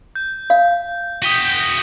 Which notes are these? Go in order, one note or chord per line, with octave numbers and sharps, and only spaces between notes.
G6
F5
F#4 G5 D#6 B6 D#7